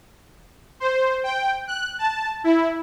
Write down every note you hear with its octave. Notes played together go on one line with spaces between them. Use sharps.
C5
G5
F#6
A5
E4